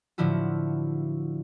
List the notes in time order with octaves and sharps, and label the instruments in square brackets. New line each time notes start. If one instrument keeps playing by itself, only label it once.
[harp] A2 D3 F3 E4 F#4